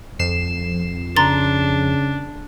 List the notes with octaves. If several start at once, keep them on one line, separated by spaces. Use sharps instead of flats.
F2 C7 E7
C#3 D4 A#5 C6 A6